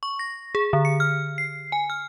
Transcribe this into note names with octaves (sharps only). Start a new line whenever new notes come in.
C#6
A#6
G#4
D3
C#7
F6
C7
G#5
F6